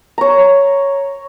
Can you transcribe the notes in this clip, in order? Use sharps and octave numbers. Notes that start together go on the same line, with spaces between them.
C#5 A#5